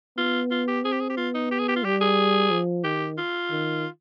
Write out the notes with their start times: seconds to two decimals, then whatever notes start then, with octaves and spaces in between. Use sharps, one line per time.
0.17 B3 F4
0.51 F4
0.68 G4
0.85 C4 G#4
0.92 G4
1.00 G#4
1.10 G4
1.17 B3 F4
1.35 D#4
1.52 G4
1.59 G#4
1.68 G4
1.76 F4
1.85 G3 G4
2.01 G#4
2.51 F3
2.84 D#3 G4
3.18 F4
3.51 D#3